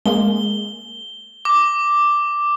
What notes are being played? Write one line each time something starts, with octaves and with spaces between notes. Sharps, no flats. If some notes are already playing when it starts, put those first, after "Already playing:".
G#3 A#3 G7
D6